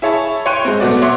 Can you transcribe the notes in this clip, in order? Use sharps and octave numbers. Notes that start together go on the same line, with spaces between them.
E4 G#4 C#5 E5 A5 B5
C#5 G5 C6 F#6 D#7
G#3 C4
B2 A3 B3 F#4 D5
C#5 E5 F#5 C6 D6